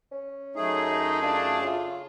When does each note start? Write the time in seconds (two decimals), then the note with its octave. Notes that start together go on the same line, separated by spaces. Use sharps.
0.12 C#4
0.56 F#2 A3 D#4 G#4
1.23 D4 F4
1.62 C#3 F4